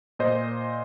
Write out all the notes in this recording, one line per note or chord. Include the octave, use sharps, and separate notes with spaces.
A#2 C5 D#5